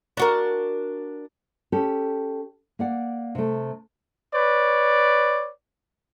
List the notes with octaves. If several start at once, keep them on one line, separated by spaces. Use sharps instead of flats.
D4 F#4 A#4
C#4 G4 A4
A#3 D5 F#5
C3 A3
B4 C#5 D5